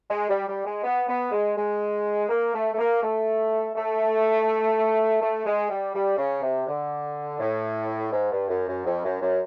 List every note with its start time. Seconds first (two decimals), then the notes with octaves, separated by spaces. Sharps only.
0.10 G#3
0.29 G3
0.47 G3
0.65 G#3
0.83 B3
1.07 B3
1.32 G#3
1.56 G#3
2.29 A#3
2.54 A3
2.72 A3
2.78 A#3
3.02 A3
3.75 A3
5.21 A3
5.45 G#3
5.69 G3
5.94 G3
6.17 C#3
6.41 C3
6.67 D3
7.39 A2
8.12 G#2
8.30 G2
8.49 F#2
8.67 F#2
8.85 F2
9.04 F#2
9.21 F#2